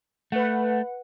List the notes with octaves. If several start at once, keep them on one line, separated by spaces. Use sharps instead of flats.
A3 B4 F#5